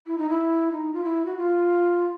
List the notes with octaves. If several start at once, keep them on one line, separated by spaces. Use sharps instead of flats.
E4
D#4
E4
D#4
F4
E4
F#4
F4